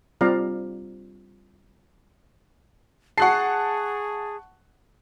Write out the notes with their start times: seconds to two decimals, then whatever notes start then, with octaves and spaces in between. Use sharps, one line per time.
0.21 G3 C4 F4 D5 F5 A#5
3.18 G#4 F#5 A5 C#6 F#6 C7